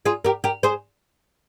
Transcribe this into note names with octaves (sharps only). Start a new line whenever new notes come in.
F4 G#4
G4 A#4
G4 A#4
G#4 C5